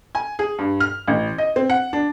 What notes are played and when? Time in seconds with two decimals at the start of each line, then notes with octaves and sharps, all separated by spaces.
0.15 G#5
0.39 G#4
0.58 G2
0.80 F6
1.07 A1
1.38 D#5
1.56 C4
1.70 F#5
1.93 D4